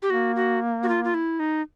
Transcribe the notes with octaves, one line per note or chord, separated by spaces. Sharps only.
G4
A#3 F#4
F#4
F#4
F4
F4
E4
D#4